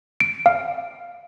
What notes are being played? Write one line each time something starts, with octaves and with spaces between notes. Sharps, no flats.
D7
F5